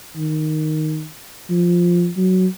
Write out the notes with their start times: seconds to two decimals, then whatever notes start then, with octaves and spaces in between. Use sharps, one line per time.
0.17 D#3
1.50 F3
2.17 F#3